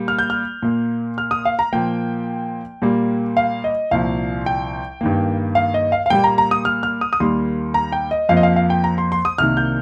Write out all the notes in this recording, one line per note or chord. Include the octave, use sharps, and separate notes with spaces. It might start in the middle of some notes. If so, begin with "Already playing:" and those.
Already playing: A#2 G3 A#3
F6
G6
F6
A#2 A#3
F6
D#6
F5
A#5
A#2 F3 A#3 G5
A#2 G3 A#3
F5
D#5
C2 A#2 F3 F5
G5
G2 D#3 A#3
F5
D#5
F5
F5
A#2 G3 A#3 G5
A#5
A#5
D#6
F6
F6
D#6
D#6
D#2 D#3 G3 A#3 C6
A#5
G5
D#5
F2 F3 A#3 F5
D#5
F5
F5
G5
A#5
C6
C6
D#6
C2 C3 D#3 A#3 F6
G6